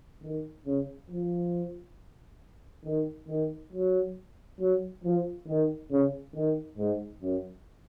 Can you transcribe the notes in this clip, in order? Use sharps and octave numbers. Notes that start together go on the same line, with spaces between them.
D#3
C#3
F3
D#3
D#3
F#3
F#3
F3
D#3
C#3
D#3
G#2
F#2